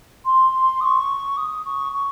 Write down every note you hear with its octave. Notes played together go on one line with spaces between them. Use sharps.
C6
D#6
C#6
D#6
C#6
C#6